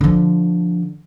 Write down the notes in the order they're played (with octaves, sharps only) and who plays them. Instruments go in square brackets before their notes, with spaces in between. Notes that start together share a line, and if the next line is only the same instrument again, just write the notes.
[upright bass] D3 F3